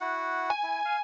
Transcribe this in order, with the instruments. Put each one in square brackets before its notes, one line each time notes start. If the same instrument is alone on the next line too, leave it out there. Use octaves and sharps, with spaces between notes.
[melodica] E4 F#4 F#5
[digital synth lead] G#5
[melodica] E4
F5